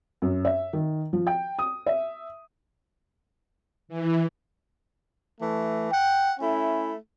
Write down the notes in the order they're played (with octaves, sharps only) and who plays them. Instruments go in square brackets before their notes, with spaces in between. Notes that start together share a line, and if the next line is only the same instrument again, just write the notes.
[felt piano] F#2
E5
D#3
F3
G5
D#6
E5
[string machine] E3
[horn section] E3 A3
F#5 G5
A3 C#4 E4